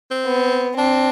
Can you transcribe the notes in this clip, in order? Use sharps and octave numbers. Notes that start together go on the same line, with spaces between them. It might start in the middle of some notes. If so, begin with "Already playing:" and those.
C4
B3
C4 D4